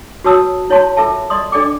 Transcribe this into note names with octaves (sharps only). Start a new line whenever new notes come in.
F#4 B4 C#5 A5 D#6 E6
E4 C#5 F5 A5 C6
F4 A4 A#4 E5 A5
D5 D#5 C6 D#6
D4 A4 D5 D#5 G5 D6